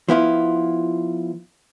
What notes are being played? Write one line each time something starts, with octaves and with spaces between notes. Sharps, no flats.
F3 B3 E4 F4